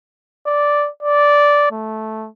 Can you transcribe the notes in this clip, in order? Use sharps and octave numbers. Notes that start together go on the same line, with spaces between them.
D5
D5
A3